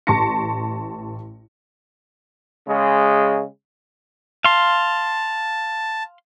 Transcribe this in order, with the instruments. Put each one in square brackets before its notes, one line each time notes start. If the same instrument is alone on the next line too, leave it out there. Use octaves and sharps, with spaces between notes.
[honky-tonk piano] A1 A5 C6 C#6 A#6 C#7
[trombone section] C#3 G#3
[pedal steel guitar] F5 C6 [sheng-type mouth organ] A5